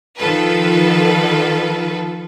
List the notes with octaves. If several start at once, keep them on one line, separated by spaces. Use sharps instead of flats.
D#3 F3 F4 A4 B4